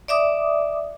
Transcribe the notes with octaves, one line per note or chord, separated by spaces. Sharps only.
D5 E5 D6 D#6